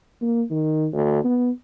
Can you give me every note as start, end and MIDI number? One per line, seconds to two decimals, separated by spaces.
0.22 0.43 58
0.51 0.88 51
0.93 1.20 38
1.24 1.51 59